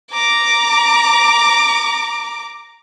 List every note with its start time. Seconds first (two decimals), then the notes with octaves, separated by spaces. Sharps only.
0.12 A#5 D6